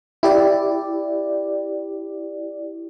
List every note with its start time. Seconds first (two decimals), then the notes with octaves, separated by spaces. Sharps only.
0.23 E4 G4 D5